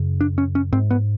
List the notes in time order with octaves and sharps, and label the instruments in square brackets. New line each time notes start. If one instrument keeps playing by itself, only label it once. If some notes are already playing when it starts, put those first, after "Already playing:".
Already playing: [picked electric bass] F#2 C#3
D4
C#4
C#4
G#2 C4
B3